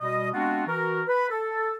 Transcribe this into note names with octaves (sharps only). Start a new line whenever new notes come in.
B2 G3 D#5
G#3 B3 C4 D4 F4 F#4
E3 F#4 A#4
B4 B5
A4